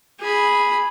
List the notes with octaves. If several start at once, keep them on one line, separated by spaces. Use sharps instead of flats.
G#4 B5